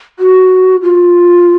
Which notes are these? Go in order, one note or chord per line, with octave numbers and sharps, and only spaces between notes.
F#4
F4